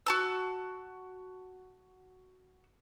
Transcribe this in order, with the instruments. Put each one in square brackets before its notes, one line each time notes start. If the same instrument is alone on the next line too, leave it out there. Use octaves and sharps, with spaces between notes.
[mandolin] F#4 A5 E6